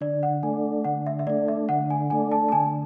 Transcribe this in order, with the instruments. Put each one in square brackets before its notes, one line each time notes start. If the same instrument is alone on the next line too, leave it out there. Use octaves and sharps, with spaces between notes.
[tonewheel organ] D3 [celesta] D5
[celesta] F#5
[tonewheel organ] A3 D4 [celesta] G#5
[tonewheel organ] D3 [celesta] F#5
[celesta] E5
E5
[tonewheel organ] A3 D4 [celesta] D5
[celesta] E5
[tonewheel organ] D3 [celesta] F#5
[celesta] G#5
[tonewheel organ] A3 D4 [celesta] G#5
[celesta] A5
A5
[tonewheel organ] D3 [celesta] G#5